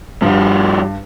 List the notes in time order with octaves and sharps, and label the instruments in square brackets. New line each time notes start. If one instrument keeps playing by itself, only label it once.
[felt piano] G2 [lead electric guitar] F3 G3